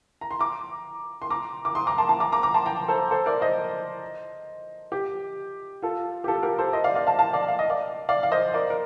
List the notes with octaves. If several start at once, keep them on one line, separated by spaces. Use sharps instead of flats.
A#5
C6
A#5 D6
C6
A#5 D6
D6
C6 D#6
A#5 D6
A5 C6
A5 C6
A#5 D6
A#5 D6
A#5 D6
A5 C6
G5 A#5
A4 C5
A4 C5
A#4 D5
C5 D#5
G4
F4 A4
G4
F4 A4
G4 A#4
A4 C5
C5 D#5
D5 F5
D5 F5
F5 A5
F5 A5
D5 F5
F5
D#5
D5 F5
D5 F5
F5
C5 D#5
A#4 D5
A#4